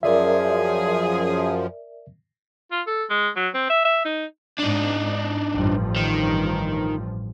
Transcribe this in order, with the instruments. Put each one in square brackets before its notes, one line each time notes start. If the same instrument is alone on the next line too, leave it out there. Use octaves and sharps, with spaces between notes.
[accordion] F#2 F3 [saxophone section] G#4 [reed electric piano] A#4 D5 E5
[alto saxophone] F4
A4
G#3
F#3
C4
E5
E5
D#4
[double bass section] G#2 [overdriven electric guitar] D4 D#4
[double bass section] A1 G2 F3
[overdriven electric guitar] D#3